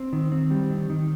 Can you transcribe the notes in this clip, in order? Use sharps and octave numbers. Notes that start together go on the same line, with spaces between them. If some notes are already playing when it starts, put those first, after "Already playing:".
Already playing: C4
D#3
C4
G3
D#3
D#3